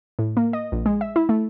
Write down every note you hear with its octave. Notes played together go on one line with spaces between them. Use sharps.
A2
A#3
D#5
A#1
G#3
E5
E4
A3